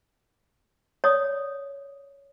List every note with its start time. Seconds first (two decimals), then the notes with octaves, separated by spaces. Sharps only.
1.04 C#5 D5 D#6